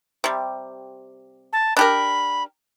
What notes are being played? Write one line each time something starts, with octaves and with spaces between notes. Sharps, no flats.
C3 G3
A5
D4 G4 A#4 B5